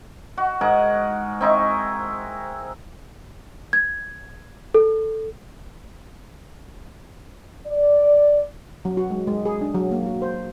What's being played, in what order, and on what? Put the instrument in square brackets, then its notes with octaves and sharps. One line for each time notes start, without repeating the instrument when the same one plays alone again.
[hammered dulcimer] F#4
G#2 G#4 A#4 F#5
C4 D#4 E4 C#6
[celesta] G#6
A4
[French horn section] D5
[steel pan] F#3
F#4
G#3
G#3
G#4
D4
F#3
A#3
F#4
C5